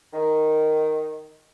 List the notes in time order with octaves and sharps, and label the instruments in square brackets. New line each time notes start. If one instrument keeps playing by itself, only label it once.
[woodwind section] D#3